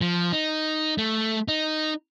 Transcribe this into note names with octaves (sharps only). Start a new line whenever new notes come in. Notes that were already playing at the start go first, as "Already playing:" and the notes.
F3
D#4
A3
D#4